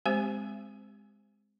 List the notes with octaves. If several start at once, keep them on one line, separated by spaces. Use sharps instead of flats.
G#3 C4 G4 C5 G#5